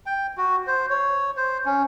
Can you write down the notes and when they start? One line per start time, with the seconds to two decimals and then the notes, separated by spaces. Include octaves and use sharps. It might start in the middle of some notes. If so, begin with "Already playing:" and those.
0.06 G5
0.37 F#4
0.67 C5
0.90 C#5
1.37 C5
1.65 C#4